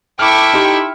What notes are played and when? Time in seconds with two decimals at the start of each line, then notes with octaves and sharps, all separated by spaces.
0.19 E4 A4 E5 G5 C#6 D6 F6
0.54 D#4 G4 C6